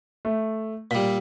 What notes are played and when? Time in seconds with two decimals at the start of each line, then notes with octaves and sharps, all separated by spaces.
0.25 A3
0.91 A#2 G3 B6